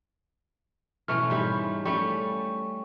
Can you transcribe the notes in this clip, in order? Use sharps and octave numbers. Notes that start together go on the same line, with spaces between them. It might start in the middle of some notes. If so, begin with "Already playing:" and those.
B2 E3 A3 C#4 C#6 F6
G#2 G3 E4
G3 A3 C#4 G5 C#6